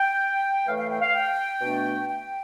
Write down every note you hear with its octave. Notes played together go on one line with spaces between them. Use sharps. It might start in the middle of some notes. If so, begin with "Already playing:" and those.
Already playing: G5
A2 E3 A3 F5
F5
G5
F5
G5
B2 A3 D4
G5